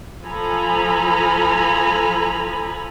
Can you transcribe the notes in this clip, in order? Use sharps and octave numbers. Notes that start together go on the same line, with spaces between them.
F3 A4 G#5 A#5 B5